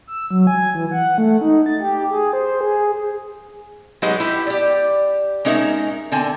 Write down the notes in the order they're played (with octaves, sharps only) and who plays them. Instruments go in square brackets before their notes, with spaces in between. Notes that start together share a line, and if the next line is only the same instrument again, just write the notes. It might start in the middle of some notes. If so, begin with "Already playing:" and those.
[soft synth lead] E6
F#3
G#5
E3
F#5
A3
D#4
A6
G4
G#4
C5
G#4
[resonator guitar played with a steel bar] F#3 G#3 D#4 G4 B4 D#5
E4 G4
G4 D5
G#3 C#4 D#4 A#4 E5
D3 C4 G#5